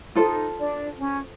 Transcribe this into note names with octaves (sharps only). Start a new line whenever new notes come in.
D#4 F4 A4 C5
D4
C#4